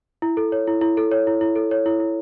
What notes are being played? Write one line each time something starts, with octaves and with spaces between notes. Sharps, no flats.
E4
A4
C#5
E4
E4
A4
C#5
E4
E4
A4
C#5
E4
E4